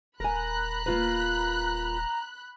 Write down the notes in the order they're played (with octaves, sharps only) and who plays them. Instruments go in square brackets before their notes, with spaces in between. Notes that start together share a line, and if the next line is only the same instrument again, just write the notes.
[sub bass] D#1 [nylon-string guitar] A#4 G#5 [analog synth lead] A#5 [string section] B5 F#6
[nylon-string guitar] A#3 F4 B4